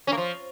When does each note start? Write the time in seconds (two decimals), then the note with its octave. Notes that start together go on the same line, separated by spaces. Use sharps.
0.07 C#4
0.12 A#3
0.17 F3